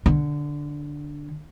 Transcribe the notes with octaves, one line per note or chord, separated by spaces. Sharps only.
D3